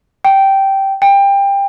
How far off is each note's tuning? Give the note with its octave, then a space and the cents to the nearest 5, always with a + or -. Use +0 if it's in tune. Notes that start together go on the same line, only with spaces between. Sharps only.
G5 -10
G5 +20